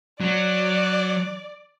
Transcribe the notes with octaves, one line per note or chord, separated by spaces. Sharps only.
F#3 F#4 D5